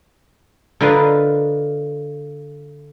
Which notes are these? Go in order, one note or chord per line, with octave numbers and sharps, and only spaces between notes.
D3 F4 A#4 B4 D#5 F5